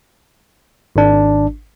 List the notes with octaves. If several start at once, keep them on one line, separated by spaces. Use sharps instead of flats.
G#1 D4